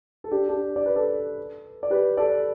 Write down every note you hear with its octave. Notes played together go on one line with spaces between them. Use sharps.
A4
D4 G4
D4 G4
D5
B4
A4 D5
D5
G4 B4
A4 D5